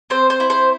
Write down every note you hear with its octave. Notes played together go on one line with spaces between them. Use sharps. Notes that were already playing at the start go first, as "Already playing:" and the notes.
C4 C5
C5
E4
C5